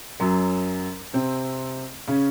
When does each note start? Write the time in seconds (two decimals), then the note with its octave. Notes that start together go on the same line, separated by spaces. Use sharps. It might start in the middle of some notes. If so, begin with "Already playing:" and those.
0.20 F#2 F#3
1.13 C3 C4
2.08 C#3 C#4